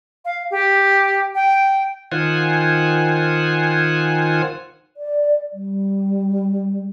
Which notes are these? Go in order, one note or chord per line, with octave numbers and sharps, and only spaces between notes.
F5
G4
G5
D#3 F4 C5 F#5 G#5
D5
G3